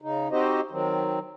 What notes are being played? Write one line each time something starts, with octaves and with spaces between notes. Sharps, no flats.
C#3 D#4
C4 D#4 F#4 G4 C5 D#5
D#3 F#3 C4